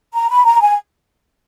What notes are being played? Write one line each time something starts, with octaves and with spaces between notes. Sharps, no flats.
A#5
B5
A#5
G#5